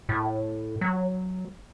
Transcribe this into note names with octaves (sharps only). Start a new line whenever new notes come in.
A2
F#3